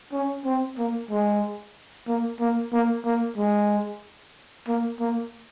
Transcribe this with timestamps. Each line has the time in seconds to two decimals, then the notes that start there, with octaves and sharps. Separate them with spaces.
0.12 C#4
0.45 C4
0.78 A#3
1.11 G#3
2.08 A#3
2.40 A#3
2.72 A#3
3.05 A#3
3.38 G#3
4.68 A#3
5.00 A#3